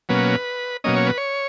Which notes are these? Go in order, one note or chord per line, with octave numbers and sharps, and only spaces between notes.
B2 F#3 A#3 C#4 B4
B2 F#3 A#3 C#4 D#5
C#5
B4
C#5